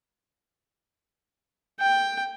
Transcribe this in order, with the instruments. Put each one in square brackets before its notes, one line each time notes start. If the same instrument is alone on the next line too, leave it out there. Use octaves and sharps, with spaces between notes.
[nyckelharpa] G5